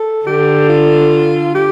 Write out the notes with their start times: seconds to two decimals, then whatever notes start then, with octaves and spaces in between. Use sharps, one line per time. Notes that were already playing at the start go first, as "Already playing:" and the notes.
Already playing: A4
0.26 D3 G4
0.69 F4
1.55 G4